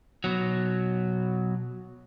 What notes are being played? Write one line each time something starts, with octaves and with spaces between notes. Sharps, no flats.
B2 F#3